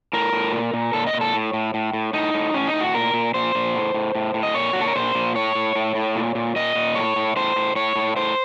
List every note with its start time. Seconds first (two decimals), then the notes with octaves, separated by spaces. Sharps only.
0.13 A2 A#4
0.33 A2
0.53 A#2
0.74 A#2
0.93 A#2 A4
1.07 D#5
1.13 A#2
1.21 A4
1.34 A2
1.53 A2
1.74 A2
1.93 A2
2.13 A2 D#4
2.34 A2
2.54 A2 C#4
2.68 D#4
2.74 A2
2.81 F#4
2.94 A#2 A#4
3.14 A#2
3.34 A#2 C5
3.55 A#2
3.75 A2
3.94 A2
4.15 A2
4.34 A2
4.43 D#5
4.55 A#2 C#5
4.73 A#2 F#4
4.81 A4
4.88 A#4
4.95 A#2 C5
5.15 A#2
5.35 A2 C#5
5.55 A2
5.75 A2
5.95 A2
6.16 A#2
6.35 A#2
6.56 A#2 D#5
6.75 A#2
6.95 A2 C#5
7.16 A2
7.36 A2 C5
7.56 A2
7.76 A2 C#5
7.96 A2
8.16 A2 C5